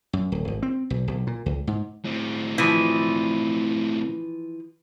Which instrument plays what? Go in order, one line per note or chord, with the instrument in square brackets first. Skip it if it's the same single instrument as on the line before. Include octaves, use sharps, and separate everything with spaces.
[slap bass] F#2
D1
G#1
C4
B1
B1
A#2
C#2
G#2
[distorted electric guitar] A2 C4
[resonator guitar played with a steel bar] E3 F3